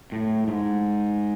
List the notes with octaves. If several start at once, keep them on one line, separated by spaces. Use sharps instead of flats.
A2
G#2